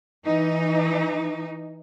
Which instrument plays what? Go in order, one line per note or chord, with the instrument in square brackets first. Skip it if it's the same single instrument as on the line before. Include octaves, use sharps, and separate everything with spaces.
[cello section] E3 D#4